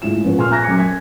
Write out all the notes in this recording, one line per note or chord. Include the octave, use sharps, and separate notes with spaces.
A2 G#3 F4 E7
F3 B3 C#4
A#2 G#5 C6 F6
A#5 F#6 G#6 A#6
F#2 C#4 G#5 D6 C#7
G#6 B6